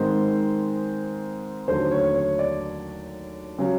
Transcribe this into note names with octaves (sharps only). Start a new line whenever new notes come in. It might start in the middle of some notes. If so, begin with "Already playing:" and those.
Already playing: G#2 D#3 G#3 C4 C5
D#2 D3 F#3 A3 C5
C#5
C#5
D5
C#3 F#3